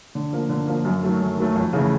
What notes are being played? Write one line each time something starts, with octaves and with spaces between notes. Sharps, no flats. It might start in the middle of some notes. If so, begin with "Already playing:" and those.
D3
F3 A#3
D3
F3 A#3
F#2
D#3 F#3 A3
F#2
D#3 F#3 A3
F2
C#3 E3 A3